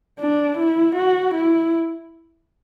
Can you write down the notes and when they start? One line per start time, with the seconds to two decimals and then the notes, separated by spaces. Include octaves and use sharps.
0.20 D4
0.58 E4
0.96 F#4
1.35 E4